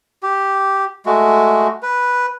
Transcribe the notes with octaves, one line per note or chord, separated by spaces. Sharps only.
G4
G#3 A3 F#4
B4